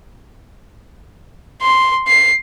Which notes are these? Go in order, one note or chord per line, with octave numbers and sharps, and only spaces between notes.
C6
C7